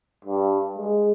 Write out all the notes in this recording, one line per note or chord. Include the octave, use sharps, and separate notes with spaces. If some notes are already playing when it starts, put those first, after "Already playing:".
G2
G#3